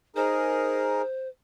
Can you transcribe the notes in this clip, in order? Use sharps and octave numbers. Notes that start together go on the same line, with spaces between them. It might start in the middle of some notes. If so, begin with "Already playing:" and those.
D#4 G#4 A#4 C5